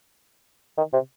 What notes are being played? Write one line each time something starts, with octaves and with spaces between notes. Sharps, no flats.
D#3
C3